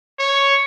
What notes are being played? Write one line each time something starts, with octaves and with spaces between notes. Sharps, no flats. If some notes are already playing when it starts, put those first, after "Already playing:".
C#5